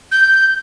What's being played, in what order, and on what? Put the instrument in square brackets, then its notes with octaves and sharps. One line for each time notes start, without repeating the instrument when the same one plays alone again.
[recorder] G6